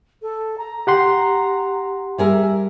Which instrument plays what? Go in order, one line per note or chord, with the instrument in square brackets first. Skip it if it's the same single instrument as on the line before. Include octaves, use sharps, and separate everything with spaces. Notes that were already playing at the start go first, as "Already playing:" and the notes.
[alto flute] A4
A#5
[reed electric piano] G4 F#5 C6
[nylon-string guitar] G3 G#4 A#4 [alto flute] E5